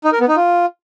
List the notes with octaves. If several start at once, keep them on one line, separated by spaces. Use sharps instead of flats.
D#4
A#4
B3
D#4
F4